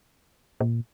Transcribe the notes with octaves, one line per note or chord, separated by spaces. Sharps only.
A#2